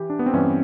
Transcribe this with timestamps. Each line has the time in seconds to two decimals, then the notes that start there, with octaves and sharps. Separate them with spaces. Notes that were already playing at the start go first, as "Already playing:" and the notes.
Already playing: E3 G4
0.10 D4
0.19 B3
0.26 C4
0.33 G2 E3 C#4